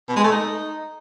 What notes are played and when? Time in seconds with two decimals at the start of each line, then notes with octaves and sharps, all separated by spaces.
0.08 B2
0.16 G#3
0.24 A3
0.31 D#4